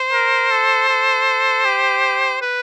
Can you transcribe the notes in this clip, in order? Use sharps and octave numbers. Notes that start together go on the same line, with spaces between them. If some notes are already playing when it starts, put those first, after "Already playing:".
Already playing: C5
A#4
A4
A4
G4
B4